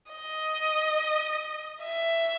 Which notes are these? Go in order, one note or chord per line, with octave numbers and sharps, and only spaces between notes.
D#5
E5